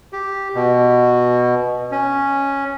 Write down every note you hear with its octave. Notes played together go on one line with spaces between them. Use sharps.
G4
B2
C#4